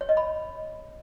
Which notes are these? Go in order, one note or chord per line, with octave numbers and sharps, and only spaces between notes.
C#5
D#5
B5